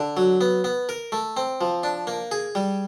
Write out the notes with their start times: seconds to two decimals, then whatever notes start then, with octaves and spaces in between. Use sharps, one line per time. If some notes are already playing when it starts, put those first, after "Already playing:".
Already playing: D3
0.17 F#3
0.41 B3
0.64 B3
0.89 A#4
1.12 A3
1.37 C4
1.61 F3
1.83 D4
2.07 A#3
2.31 G#4
2.55 G3